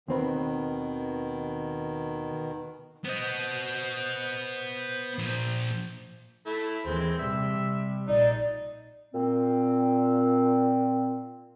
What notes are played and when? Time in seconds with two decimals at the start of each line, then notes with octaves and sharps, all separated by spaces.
0.08 D#2 B2 D#3 C4 B4
3.05 B3 C5 D#5
5.18 A#2 F3
6.46 A3 E4
6.85 D#2 E3 G#3 C4
7.19 C3 G3 E5
8.08 A#1 D#4 D5
9.15 A#2 C4